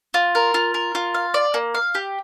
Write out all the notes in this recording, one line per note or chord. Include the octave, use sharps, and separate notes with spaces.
F4
A#4
F4
A#4
F4
F5
D5
A#3
F5
G4